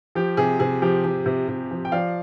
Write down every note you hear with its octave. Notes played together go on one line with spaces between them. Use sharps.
F3 G4
C3 G#4
C3 G#4
F3 G4
F3
C3
C3
F3
G5
F3 D5 F5